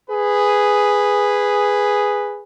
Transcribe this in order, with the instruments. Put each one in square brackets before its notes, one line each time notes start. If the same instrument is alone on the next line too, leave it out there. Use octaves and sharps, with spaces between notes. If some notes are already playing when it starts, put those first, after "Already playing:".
[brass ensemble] G#4 B4